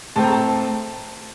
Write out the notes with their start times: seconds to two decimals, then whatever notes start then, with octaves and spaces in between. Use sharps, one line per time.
0.16 A2 A3 C4 A5
0.24 A#5
0.32 A5